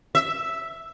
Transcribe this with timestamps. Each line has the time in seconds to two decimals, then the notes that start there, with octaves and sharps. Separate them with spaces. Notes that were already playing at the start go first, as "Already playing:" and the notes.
0.15 E5